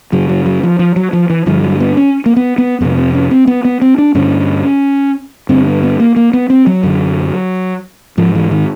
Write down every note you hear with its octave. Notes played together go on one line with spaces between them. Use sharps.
F#2 C#3 F#3
F#3
F#3
F3
F3
F#3
F3
E3
G2 D3 F3
F#3
B3
C#4
A#3
B3
B3
F2 C3 B3
C4
C#4
C4
B3
B3
C4
D4
G2 D3 C#4
G2 D3 C4
B3
B3
A#3
A#3
B3
C4
F#3
F#2 D3
G#2 F3
E3
D#3